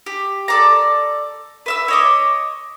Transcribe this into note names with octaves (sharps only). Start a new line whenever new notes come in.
G4
A4 D5 A#5
B4 E5 E6
C#5 D#5 D6